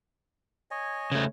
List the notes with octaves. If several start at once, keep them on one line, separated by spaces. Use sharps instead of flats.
C#5 D#5 G#5
C#3 A3